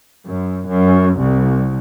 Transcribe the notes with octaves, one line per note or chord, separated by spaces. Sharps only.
F#2
F#2
C2